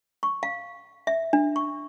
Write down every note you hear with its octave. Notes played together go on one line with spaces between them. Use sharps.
C#6
F5
E5
D4
C#6